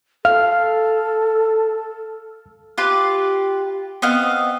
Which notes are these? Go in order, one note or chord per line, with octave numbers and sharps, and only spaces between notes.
A4 F5 F6
F4 G4 B4
B3 C4 D#5 F5